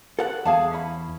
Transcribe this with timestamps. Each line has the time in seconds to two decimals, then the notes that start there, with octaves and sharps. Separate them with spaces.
0.19 A4 F#5
0.45 E2 G#4 F5 A5
0.72 C#4 E4 B5